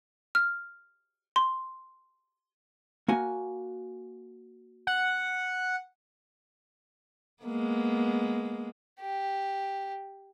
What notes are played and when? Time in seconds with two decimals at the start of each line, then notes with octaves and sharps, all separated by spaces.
0.35 F6
1.36 C6
3.08 A#3 F#4 G#5
4.87 F#5
7.43 G#3 A#3 B3
9.01 G4